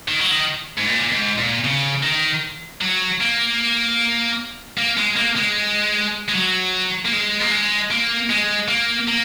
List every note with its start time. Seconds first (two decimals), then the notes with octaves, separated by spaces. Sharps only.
0.08 D#3
0.19 F#3
0.31 D#3
0.77 G#2
0.86 A#2
1.12 G#2
1.38 A#2
1.64 C#3
2.03 D#3
2.81 F#3
3.21 A#3
4.78 A#3
4.97 G#3
5.16 A#3
5.36 G#3
6.29 G#3
6.34 F#3
7.05 A#3
7.13 G#3
7.40 A#3
7.51 G#3
7.91 A#3
8.30 G#3
8.68 A#3
9.08 A#3